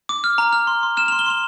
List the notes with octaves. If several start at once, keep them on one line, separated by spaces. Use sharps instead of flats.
D6
F6
A#5
F6
C6
C6
F6 E7
F7
C6
G7
C6 F7